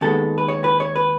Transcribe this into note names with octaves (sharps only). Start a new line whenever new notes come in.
D#2 D#3 G#3 B3 A4
B4
C#5
B4
C#5
B4